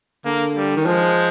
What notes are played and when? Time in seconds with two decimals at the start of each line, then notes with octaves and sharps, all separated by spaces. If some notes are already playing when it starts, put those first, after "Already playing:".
0.25 D3 A#3
0.56 G3
0.76 D#3
0.85 F3 G#3